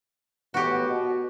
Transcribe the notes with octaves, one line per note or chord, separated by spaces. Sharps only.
A2 E3 B3 F#4 G4
B2